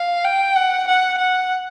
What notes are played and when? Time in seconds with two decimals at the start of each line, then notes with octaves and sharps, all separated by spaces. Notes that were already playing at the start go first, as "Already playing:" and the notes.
Already playing: F5
0.24 G5
0.56 F#5
0.87 F#5
1.18 F#5